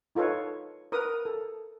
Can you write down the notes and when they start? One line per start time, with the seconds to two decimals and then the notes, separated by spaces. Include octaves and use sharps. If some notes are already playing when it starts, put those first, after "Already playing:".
0.15 D#4 F4 A4 B4 C#5
0.92 A#4 B4 D#6
1.25 A4